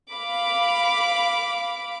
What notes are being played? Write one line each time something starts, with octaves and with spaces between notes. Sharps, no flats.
F5 B5 D6